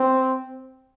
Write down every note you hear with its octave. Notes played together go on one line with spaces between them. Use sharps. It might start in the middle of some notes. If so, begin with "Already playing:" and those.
Already playing: C4